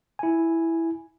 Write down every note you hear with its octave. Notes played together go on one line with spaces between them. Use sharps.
E4 G#5